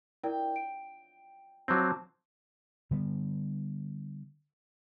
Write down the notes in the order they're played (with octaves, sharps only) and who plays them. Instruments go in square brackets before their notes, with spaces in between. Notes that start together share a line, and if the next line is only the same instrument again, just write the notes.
[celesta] E4 A#4 D5 [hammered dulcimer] G5
[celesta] D7
[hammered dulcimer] F3 A5 [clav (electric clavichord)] F#3 C4 [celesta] C6 D6
[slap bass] D3 G3 B3